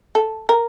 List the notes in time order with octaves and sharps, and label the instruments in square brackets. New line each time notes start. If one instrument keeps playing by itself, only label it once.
[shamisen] A4
A#4